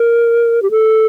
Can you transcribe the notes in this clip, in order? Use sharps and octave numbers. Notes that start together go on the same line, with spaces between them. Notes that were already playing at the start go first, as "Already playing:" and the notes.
Already playing: A#4
G4
A4